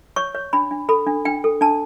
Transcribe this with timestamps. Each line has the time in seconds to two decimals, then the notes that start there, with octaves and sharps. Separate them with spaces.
0.16 C#5 C#6
0.35 C#5
0.53 D4 B5
0.71 D4
0.89 A4 B5
1.07 D4
1.25 D4 G5
1.44 A4
1.61 D4 A5